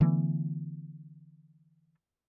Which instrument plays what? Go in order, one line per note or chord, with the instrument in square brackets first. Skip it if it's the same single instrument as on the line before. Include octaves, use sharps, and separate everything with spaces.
[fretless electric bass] D3 E3 A3 B3